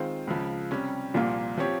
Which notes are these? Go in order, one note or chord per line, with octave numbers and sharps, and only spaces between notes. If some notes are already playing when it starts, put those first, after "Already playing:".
Already playing: D#3 G#3 C4 F4 C5
C#2 C#3 F3
C3 G3 C#4
C2 A#2 F3 A#3 F4
F3 C4 G4 C#5